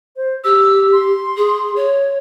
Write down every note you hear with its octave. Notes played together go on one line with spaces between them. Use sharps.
C5
G4 E6
C6
G#4
C#5